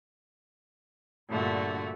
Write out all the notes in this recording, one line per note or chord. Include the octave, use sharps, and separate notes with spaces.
G2 A#2 D3 A3 F#4